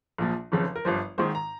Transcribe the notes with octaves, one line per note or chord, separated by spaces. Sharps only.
A#1 A#2 F3
F1 F2 C#3 F3
A#4
G1 G2 F3 C5
G#1 G#2 D#3 C5
A#5